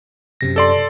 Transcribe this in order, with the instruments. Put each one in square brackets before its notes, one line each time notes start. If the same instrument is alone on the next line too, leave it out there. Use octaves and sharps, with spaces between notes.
[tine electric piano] F#2 C3 A#6
[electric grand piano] A4 D5 C6